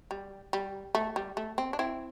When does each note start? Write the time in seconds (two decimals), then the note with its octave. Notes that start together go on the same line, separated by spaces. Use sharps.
0.11 G3
0.53 G3
0.95 A3
1.16 G3
1.37 A3
1.58 C4
1.73 D4
1.79 C4 E4